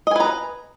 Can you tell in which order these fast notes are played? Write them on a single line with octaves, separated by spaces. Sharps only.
D#5 G#5 B4 A#5